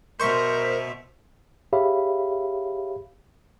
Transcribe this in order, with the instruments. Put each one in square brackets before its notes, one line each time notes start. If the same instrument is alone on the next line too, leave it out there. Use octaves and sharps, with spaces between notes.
[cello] B2 E5 [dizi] A#4 [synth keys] C5 C#6
[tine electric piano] G4 G#4 C#5 E5 F5 B5